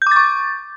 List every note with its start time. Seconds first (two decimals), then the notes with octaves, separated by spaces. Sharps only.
0.02 G6
0.07 D6
0.11 A6
0.16 C#6